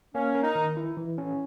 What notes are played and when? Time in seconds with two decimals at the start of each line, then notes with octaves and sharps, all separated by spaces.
0.14 A#3 C#4
0.35 A#4
0.42 D#4
0.55 D#3
0.77 E4
0.97 E3
1.18 C#4